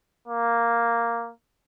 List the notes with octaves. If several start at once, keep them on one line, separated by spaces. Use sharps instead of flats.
A#3